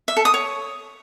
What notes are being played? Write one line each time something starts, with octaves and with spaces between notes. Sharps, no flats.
E5
A4
D#6
C#5